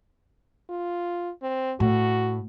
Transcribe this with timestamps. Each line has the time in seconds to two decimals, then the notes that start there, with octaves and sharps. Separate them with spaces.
0.70 F4
1.42 C4
1.80 A2 F#4